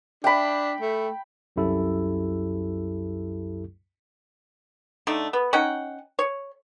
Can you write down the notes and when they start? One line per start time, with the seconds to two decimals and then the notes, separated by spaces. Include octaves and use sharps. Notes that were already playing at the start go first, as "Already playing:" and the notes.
0.24 D4 G5 B5
0.80 A3
1.56 C2 F#2 F#3 E4 G4 A4
5.07 D3 A3 D#4
5.33 B3
5.53 C#4 D#4 F#5 G5
6.19 C#5